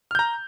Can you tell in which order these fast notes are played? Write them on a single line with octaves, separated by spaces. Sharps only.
F6 G6 A#5